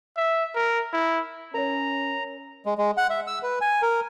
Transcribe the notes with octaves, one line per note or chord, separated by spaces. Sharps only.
E5
A#4
E4
C#4 A#4 C#5 A#5
G#3
G#3
F#5
E5
E6
B4
G#5
A#4